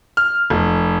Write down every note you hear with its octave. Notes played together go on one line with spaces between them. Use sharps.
F6
F1